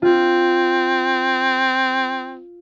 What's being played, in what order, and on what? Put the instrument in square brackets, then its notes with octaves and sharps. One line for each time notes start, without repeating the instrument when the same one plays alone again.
[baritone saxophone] C4 [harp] F4